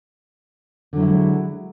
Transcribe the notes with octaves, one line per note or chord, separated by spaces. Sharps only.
D3 F#3 G#3 E4 F#4